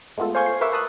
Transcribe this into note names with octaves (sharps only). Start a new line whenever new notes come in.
G#3 A3 B3 F4 A4
C5 F5 G#5 C#6 G6 G#6
C7
A#4 B4 E5 C#6 D6 E6
B4 A5 D#6 F#6